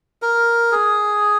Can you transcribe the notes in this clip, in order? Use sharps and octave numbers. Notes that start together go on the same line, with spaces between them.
A#4
G#4